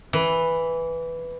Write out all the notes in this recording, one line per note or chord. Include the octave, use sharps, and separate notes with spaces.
E3